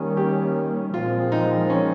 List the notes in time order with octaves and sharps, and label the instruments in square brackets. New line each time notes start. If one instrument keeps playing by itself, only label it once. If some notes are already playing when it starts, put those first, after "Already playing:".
Already playing: [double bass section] D#3 G3 A#3 C#4
[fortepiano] G4
[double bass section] A#2 F3 G#3 C4 [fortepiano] F4
[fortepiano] D#4
C#4